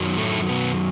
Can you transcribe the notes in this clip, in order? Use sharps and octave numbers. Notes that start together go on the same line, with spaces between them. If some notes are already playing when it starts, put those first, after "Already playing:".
Already playing: F#2 D#3 F#3
A2 A3
B2 B3